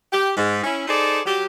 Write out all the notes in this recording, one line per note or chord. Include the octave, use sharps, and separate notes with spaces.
G4
G#2
C#4 E4
D#4 G#4 A4 C5 D5
F#3 G4